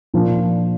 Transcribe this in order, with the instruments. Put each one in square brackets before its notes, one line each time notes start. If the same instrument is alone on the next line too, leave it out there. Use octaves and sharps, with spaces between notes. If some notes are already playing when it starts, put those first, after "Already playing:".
[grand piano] A#2 F3 D4